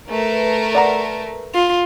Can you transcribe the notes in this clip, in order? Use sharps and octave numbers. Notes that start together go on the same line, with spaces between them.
A3 A#4 B4
D5 F#5 A#5
F4